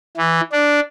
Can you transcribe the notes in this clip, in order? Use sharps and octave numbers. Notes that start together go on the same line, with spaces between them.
E3
D4